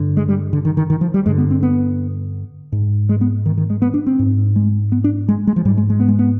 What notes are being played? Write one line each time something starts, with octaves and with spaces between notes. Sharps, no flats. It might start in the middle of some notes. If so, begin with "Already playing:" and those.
Already playing: G2 D3
G#3
G3
D3
D#3
D#3
D#3
F3
G3
G2 D3 G#3
B3
C4
B3
G#2
G#3
B3
D#3
D#3
G#3
B3
D4
C4
G#2
G#3
B3
D4
G#3
G#3
F3
G#2 G3
G#3
G#3
B3
G#3
B3